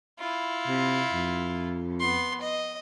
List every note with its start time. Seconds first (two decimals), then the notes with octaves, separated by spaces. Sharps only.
0.19 E4 F4
0.68 C3
1.12 F2
2.00 B3 C6
2.41 D#5